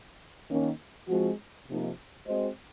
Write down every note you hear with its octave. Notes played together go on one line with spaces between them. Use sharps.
D#3 A#3 C#4
F3 G#3 C4 F#4
C3 F3 A#3 D#4
G#3 C4 F#4 C5 D#5